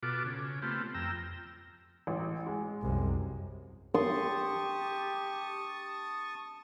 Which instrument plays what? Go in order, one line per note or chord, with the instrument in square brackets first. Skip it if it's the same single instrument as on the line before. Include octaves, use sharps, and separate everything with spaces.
[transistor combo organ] B2 F4 F#4 A4 D6
C#3
A3 B3 C4 F4 G4
F2 G5 A#5 E6
[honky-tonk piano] A1
G#3
[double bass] C2 F#2
[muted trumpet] G4 [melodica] A5 C#6 D#6 [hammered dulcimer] C6